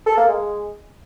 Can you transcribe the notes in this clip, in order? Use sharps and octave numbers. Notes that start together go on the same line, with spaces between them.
A4
A#3
G#3